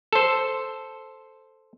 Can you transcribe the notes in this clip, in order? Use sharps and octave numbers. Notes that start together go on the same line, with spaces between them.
A4 C5